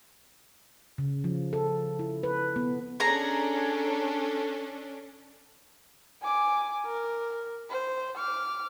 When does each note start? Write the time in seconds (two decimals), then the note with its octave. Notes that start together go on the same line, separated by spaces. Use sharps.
0.98 C#3
1.24 F3
1.53 A4
1.99 E4
2.23 B4
2.56 B3
3.00 C#4 D4 G#4 A4 A#5
6.23 G#5 D6
6.86 A#4
7.70 C5
8.18 D6 F6